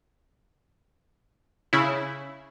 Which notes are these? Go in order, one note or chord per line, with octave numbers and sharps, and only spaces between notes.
C#3 E4